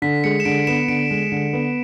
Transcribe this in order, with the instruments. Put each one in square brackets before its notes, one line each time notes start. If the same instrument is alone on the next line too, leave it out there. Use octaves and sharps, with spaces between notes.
[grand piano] D3 [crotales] B6
[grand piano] G#3 [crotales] C#7
[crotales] E7
[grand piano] D3 [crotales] D7
[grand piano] B3 [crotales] E7
[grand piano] D3 [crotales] D7
[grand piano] G#3
D3
B3